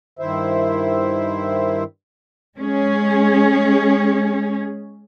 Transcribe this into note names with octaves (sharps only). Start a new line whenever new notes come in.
G2 D#3 E4 C5 E5
G#3 C#4 G#4